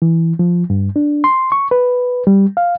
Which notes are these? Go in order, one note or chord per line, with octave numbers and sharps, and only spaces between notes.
E3
F3
G2
D4
C6
C#6
B4
G3
F5